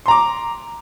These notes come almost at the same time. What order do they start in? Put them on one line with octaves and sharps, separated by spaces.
C6 A#5 D6